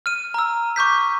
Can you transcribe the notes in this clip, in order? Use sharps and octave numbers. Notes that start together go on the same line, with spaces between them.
F6 D#7
A#5 E6
C#6 D6 G6 B6